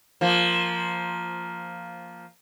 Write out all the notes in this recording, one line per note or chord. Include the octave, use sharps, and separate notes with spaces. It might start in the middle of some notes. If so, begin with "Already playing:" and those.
F3 A#3